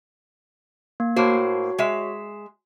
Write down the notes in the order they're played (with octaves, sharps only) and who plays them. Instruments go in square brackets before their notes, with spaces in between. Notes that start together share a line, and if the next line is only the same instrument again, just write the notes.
[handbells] A#3
[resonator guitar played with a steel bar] A2 A#3 C5 [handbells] F#4 C#5
[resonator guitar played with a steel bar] G#3 E5